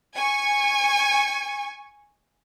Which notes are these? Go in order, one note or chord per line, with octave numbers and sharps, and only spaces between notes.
G#5 C#6